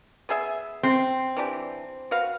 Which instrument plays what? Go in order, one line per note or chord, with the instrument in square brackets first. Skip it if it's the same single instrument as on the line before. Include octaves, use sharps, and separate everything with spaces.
[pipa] B3 G#4 E5
[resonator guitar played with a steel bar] C4
[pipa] E3 D4 G4
F#4 B4 F5